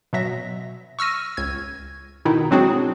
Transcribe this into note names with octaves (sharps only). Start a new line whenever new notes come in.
B2 F#3 E5 A#6
C#6 E6 F6 A#6 D#7
C#2 G#6
B2 D#3 D#4 E4
F#3 G#3 C4 D4 F#4 G#4